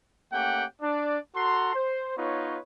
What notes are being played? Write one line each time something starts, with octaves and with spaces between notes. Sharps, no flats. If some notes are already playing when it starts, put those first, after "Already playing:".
A3 A#3 C#4 G4 F#5 G5
D4 D5
F#4 A4 F#5 A#5 C6
C5
B3 D#4 F4 B4 C#5